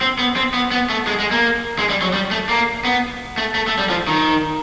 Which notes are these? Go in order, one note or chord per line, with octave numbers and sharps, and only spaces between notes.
C4
B3
C4
B3
B3
A3
G#3
G#3
A#3
G#3
G3
F#3
G3
A3
A#3
B3
A3
A3
A3
G3
F3
D#3